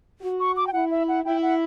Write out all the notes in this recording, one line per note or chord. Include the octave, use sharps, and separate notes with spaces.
F#4
C#6
D6
G5
E4 F#5
E5
F#5
E4 G5
F#5